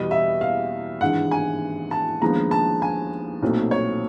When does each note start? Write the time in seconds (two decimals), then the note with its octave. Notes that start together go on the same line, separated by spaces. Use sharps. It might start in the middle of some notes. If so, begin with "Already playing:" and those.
Already playing: E2 B2 G3 B3 D#5
0.11 E5
0.41 F5
1.01 G#1 G2 E3 G#3 F#5
1.31 G#5
1.91 A5
2.21 D#2 D3 F3 G#3 B3 A#5
2.51 A5
2.82 G#5
3.42 B1 A#2 F#3 A3 C4
3.71 C#5